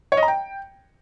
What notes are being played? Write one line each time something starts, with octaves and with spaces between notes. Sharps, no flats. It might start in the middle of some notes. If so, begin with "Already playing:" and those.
C#5
D#5
A#5
G5